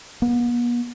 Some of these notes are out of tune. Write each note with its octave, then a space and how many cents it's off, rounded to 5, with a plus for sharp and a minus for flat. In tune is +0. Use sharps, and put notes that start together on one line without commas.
B3 -45